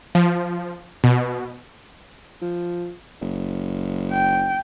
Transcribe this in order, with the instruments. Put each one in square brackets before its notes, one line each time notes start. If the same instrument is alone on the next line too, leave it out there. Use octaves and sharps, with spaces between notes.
[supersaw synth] F3
B2
[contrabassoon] F3
F#1
[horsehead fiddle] G5